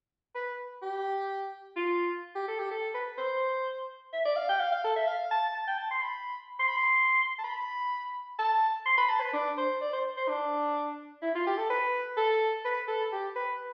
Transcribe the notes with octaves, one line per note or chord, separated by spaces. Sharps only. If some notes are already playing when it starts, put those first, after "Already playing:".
B4
G4
F4
G4
A4
G4
A4
B4
C5
E5
D5
F5
G5
F5
F5
A4
E5
F5
A5
A5
G5
A5
C6
B5
C6
B5
C6
A5
B5
A5
C6
B5
A5
B4
D4
C5
D5
C5
C5
D4
E4
F4
G4
A4
B4
A4
B4
A4
G4
B4